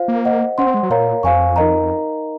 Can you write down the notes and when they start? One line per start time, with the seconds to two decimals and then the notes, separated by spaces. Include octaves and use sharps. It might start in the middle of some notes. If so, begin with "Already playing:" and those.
Already playing: F4 C5 F5
0.08 A#3
0.25 C5 D#5 F#5
0.58 C#4 C5 F#5 C6
0.67 C4
0.74 G#3
0.83 F#3
0.90 A#2 A#4 C#5 F5 A#5
1.23 F2 C5 F5 G#5 C#6
1.56 D#4 A#4 D#5 A#5